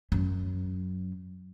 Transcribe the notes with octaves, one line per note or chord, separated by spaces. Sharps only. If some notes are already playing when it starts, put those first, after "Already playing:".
F#2 F#3